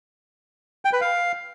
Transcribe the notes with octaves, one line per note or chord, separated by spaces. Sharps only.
G5
B4
F5